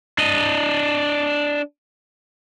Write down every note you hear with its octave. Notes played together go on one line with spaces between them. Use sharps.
D4 D#5